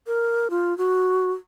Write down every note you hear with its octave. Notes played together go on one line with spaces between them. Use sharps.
A#4
F4
F#4